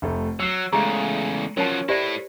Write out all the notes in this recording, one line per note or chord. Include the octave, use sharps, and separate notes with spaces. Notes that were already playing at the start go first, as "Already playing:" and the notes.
F1 A3
F#3 E6 C7
E2 C#3 G#3 A3 G#4 A#5 C#6
F3 F#3 C#4 A#4 A5
A2 E4 G4 C5 D5 A#6